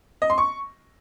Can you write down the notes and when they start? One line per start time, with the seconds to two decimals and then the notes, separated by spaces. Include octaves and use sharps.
0.22 D#5
0.30 C6
0.38 C#6